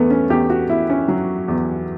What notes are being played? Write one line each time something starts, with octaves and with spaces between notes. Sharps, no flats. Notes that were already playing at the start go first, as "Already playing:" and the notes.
Already playing: E2 A3 B3
C#4
E2 G4
F#4
E2 E4
C#4
F#3
E2